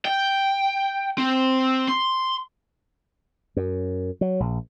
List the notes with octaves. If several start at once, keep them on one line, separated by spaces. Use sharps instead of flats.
G5
C4
C6
F#2
F#3
A#1